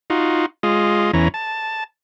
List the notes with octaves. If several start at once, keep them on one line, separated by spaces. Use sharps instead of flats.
D#4 F4 F#4
G#3 F4 D#5
E2 E3 C#4 A#5
A5